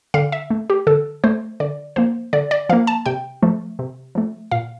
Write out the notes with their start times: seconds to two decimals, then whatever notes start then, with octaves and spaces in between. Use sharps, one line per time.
0.14 D3 F5
0.32 E5
0.50 A3
0.70 G4
0.87 D3 A4
1.24 A3 C5
1.60 D3 D5
1.96 F3 A#3 C5
2.33 D3 D5
2.51 D5
2.69 F3 A#3 F5
2.87 A5
3.06 C3 G5
3.42 F3 A3
3.79 C3
4.15 F3 A3
4.51 A#2 F5